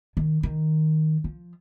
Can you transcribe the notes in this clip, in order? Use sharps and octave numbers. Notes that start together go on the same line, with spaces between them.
D#3
D#3
F3